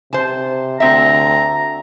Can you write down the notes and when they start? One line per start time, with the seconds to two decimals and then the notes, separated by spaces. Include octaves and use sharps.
0.13 C3 C5 A5
0.80 D2 C4 E5 A#5